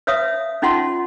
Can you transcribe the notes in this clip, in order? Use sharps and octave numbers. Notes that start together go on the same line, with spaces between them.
B4 C#5 E5 F5 D#6
C#4 D#4 F4 F#5 A5 C6